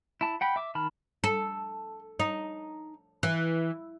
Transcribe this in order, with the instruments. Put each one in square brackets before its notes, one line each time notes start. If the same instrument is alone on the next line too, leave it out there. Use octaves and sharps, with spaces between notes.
[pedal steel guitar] E4 A5
F#5 G5 B5
E5 D6
D#3 A5 B5 F6
[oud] A4
D#4
E3